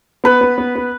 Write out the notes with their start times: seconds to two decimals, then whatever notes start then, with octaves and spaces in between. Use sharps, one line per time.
0.24 B3 B4
0.41 B3
0.58 B3
0.75 B3